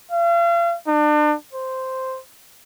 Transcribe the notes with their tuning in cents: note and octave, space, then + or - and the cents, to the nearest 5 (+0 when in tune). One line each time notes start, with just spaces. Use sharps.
F5 -40
D4 +35
C5 -5